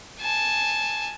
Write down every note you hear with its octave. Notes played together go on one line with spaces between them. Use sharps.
G#5 A5